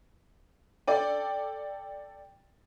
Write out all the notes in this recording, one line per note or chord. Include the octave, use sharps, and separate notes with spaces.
A4 D5 G5